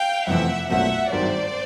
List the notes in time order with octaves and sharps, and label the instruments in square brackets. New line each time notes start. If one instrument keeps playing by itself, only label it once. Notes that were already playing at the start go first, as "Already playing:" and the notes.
Already playing: [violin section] F5 G5
[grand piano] F2 C3 E3 A3 C4 [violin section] E5 F#5
[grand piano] B1 A#2 F#3 A3 C4 [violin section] E5 F#5
[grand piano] G#1 G2 D#3 F#3 [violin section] C5 D5